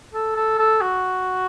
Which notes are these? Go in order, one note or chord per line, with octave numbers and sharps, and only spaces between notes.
A4
A4
A4
F#4